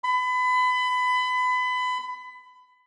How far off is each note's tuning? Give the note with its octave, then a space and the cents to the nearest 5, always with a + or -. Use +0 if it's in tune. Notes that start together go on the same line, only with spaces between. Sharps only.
B5 +30